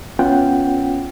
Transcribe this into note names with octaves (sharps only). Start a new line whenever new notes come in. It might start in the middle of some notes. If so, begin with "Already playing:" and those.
B3 C#4 F4 F#5 G5